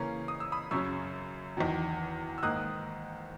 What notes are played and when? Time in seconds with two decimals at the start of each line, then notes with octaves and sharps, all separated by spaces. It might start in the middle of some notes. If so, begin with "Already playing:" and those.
Already playing: C#3 E3 A#3 C#4 A#5
0.28 D#6
0.40 E6
0.52 B5 D#6
0.71 F#2 C#3 F#3 C#4 C#6 E6
1.57 E2 D#3 F#3
2.38 E6
2.43 G#2 D#3 A#3 D#6 F#6